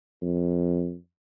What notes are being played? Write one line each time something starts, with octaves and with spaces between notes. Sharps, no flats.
F2